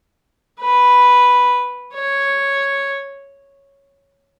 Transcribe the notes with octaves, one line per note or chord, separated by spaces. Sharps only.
B4
C#5